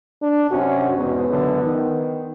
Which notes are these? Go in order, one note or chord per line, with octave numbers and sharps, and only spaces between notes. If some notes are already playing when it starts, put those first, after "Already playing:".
D4
F#2 C3 C#4 F#4
E2 G#2 B2 B3
C#2 F#2 D3
D#3